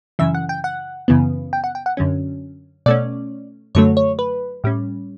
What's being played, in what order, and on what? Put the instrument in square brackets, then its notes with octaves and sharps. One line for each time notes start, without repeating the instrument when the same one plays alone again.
[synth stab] F#2 C#3 E3 E5
F#5
G5
F#5
F#2 C#3 E3 B3
G5
F#5
G5
F#5
F#2 D3 F#3 C#4
B2 A3 C#4 D5
F#2 D3 F#3 A3 C#5
C#5
B4
A2 G3 C#4